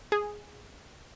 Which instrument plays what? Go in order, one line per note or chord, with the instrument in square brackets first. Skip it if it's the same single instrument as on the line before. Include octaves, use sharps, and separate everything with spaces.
[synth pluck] G#4